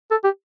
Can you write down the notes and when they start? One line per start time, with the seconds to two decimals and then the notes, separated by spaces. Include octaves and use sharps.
0.11 A4
0.24 G4